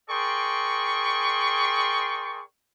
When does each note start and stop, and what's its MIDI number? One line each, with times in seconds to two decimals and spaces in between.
0.10 2.42 68
0.10 2.42 70
0.10 2.42 74
0.10 2.42 79
0.10 2.42 84
0.10 2.42 85